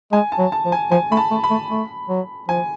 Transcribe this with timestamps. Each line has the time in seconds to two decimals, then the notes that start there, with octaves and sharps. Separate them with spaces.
0.12 G#3 G#5
0.32 A5
0.38 F#3
0.52 A5
0.65 F3
0.72 G#5
0.91 F3 G#5
1.11 A3 B5
1.17 A5
1.31 A3
1.44 B5
1.50 A3
1.70 A3
2.09 F#3
2.48 F3 G#5